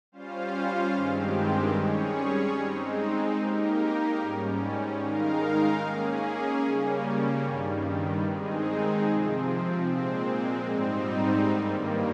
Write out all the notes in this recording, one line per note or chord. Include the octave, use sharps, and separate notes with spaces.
G3 C#4 F4 C5 F5
G2 D#3 G#3 C4 G4
G3 C#4 G#4 C#5
G#3 C4 D#4
A#3 D#4 G4 A#4
G#2 G3 C#4
D#3 G#3 D#4 A#4 F5
A#3 C#4 G#4
C#3 G3 A#3 C#4
G2 D#3 G3
D#3 G#3 C4 D#4 G#4
C3 F3 C4
A#2 G#3 C4
G#2 G3 C4 D#4
G2 D#3 G3 A#3